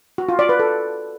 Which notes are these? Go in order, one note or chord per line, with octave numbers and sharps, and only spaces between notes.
F#4
F4
D5
B4
A4